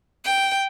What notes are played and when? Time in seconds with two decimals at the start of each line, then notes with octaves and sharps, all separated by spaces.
0.25 G5